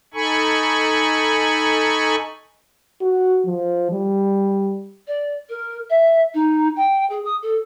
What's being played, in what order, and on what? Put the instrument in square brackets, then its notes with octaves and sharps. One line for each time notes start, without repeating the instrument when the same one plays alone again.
[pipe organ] D#4 A4 G#5 B5 C#6
[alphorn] F#4
F3
G3
[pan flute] D5
A#4
E5
D#4
G5
G#4
D#6
A4